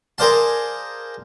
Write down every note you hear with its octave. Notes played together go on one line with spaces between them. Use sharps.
G#4 A#4 C5 D5 F5 A5